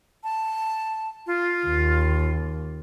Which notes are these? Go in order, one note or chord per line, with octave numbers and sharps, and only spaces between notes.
A5
F4
D#2